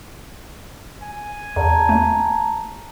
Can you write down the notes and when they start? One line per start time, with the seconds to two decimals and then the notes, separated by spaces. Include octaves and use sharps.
1.02 G#5
1.56 E2 A5 A#5
1.89 A3